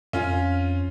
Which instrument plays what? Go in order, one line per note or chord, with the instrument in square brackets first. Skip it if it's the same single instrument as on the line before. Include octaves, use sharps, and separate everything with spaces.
[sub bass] F2 [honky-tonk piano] C#4 F4